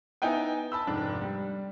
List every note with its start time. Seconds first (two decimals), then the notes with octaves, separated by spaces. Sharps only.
0.22 B3 D#4 E4 G5 G#5
0.72 A5 B5 E6
0.87 F1 G#2 D4
1.22 G3